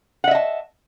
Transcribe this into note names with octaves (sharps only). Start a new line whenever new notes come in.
D#5 E5 F#5 A5